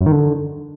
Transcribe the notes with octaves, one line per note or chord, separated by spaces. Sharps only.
F#2
D#3
D3